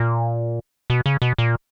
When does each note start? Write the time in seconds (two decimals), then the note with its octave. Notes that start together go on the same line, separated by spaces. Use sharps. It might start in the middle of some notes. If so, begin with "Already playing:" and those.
Already playing: A#2
0.90 B2
1.06 C#3
1.22 B2
1.38 A#2